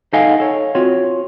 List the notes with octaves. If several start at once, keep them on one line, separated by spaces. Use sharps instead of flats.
D#4 A4 D#5 F5 F#5 G#5
A4 C#5
C4 F4 F#4 C#5